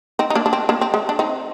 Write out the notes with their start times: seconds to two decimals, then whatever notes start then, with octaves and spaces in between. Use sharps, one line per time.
0.19 C4 D#4
0.30 D#4
0.35 A#3 D4
0.46 D4
0.53 C4
0.69 A#3 D4
0.81 C4
0.94 G#3
1.09 D4
1.19 C4 D#4